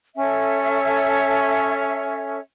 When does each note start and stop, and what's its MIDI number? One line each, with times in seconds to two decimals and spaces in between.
0.17 2.39 61
0.17 2.39 69
0.17 2.39 73
0.17 2.39 76